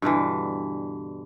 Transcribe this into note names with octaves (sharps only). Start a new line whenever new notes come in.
G2 B2 D3 E3